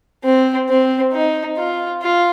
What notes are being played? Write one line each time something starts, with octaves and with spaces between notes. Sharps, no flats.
C4
C4
D#4
F4
F4